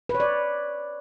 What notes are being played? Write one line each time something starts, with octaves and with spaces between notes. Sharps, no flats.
B4
C#5
D5